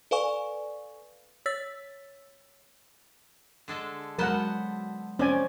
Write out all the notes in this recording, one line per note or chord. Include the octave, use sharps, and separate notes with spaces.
A4 B4 D5 F5 G#5 C#6
C#5 E6 A6 B6
D3 G#3 A4
F#3 G#3 B3 A#4 C5 F#5 A5
F3 C4 C#4 C#5 D5 G#5